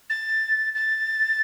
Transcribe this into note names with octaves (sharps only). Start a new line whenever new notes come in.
A6
A6